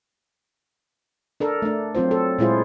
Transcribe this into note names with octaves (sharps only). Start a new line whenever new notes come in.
D4 A4 A#4
A3 D4
F#3 C4 F4 C5
A4
A#2 G#3 E4 F4 G#4 C5